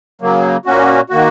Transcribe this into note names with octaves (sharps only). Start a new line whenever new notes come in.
C#3 F#3 A#3
A#2 A#3 C#4 F#4
D#3 A#3 F#4